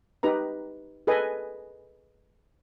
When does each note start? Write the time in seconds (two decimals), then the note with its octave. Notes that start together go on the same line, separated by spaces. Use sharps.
0.23 D#4 G4 B4 A#5
1.07 G#4 A4 B4 D#5 G#5